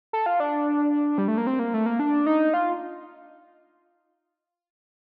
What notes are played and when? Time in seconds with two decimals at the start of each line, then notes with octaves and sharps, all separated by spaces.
0.13 A4
0.26 F4
0.40 D4
1.18 G3
1.28 A3
1.38 A#3
1.47 C4
1.59 A#3
1.74 A3
1.86 A#3
1.99 D4
2.26 D#4
2.54 F4